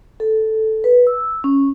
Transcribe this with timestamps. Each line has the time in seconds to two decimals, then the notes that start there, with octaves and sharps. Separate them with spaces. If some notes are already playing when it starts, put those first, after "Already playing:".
0.20 A4
0.84 B4
1.07 E6
1.44 C#4